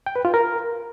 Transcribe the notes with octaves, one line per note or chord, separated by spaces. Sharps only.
G5
B4
F4
A#4